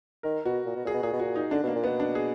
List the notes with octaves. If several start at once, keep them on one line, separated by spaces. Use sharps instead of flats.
D#3 A#4
B2 F#4
A#2
B2
A#2 G#4
B2
A#2 G#4
B2
A#2 F#4
D#4
D3 D4
B2 A#3
A#2
B2 B3
D4
G#4